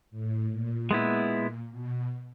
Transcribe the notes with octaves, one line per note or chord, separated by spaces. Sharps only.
A2
A#2
G#3 B3 E4
B2